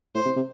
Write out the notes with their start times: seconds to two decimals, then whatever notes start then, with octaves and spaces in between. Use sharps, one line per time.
0.15 A2 C5
0.25 C3
0.36 C3